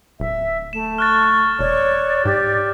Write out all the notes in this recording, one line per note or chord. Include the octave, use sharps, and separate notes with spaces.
D1 E5
A3 E7
C#6 F6 F#6 A6
E1 C#5 D5
G#2 G4